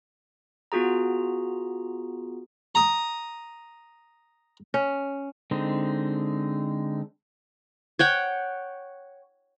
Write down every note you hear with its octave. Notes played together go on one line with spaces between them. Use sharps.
B3 F4 F#4 G#4 A#5
A#5 D#6
C#4
D3 G#3 C4 D#4
C#5 F#5 G5